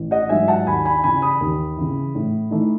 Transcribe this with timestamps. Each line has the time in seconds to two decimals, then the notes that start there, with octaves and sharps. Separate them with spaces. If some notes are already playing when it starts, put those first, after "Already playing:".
Already playing: A1
0.11 D#5 F#5
0.29 G#2 F#3 E5 G#5
0.48 F#5 A5
0.66 D#2 G#5 B5
0.85 G#5 B5
1.04 C#3 E3 G#5 B5
1.22 B5 D#6
1.40 D#2
1.77 C#3 E3
2.15 A2
2.51 E3 A3 D#4